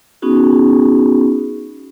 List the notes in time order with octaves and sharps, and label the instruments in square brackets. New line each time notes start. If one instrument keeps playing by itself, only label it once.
[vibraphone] B3 C#4 D#4 F#4 G#4